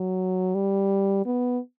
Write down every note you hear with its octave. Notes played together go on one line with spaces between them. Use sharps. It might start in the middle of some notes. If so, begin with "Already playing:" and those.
Already playing: F#3
G3
B3